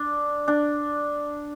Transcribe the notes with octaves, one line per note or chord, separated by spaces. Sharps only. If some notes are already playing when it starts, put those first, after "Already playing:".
Already playing: D4
D4